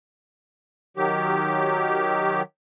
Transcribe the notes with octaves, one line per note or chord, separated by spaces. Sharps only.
D#3 F#3 G4